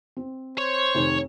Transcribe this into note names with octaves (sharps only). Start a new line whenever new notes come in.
C4
C5 C#5
F1 D#3